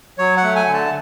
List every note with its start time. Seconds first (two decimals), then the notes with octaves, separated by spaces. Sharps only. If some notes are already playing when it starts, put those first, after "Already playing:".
0.18 F#3 C#5
0.37 F#5
0.43 A3
0.56 G#5
0.67 D3
0.74 A5